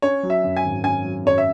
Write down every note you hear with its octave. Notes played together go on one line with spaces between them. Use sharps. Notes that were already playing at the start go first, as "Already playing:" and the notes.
C#4 C#5
F#3
E5
F#2
G#5
G#1
C#4 G#5
F#3
F#2 C#5
E5